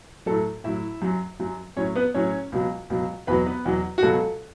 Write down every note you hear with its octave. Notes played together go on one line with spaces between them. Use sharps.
A2 F#3 A4
A2 F#3 E4 E5
F#2 F#3
F#2 F#3
A2 F#3 C#4 C#5
B3 B4
A2 F#3 C#4 C#5
C#2 B2 F#3
C#2 B2 F#3
E2 B2 F#3 B4 B5
B3 B4
E2 B2 F#3
F#4
C#2 B2 F#3 A4